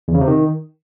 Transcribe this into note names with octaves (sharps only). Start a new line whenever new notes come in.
E2
C#3
C3
D#3